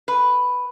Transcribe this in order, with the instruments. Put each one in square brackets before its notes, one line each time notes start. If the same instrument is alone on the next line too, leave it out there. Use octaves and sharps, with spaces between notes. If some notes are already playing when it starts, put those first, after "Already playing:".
[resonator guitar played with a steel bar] B4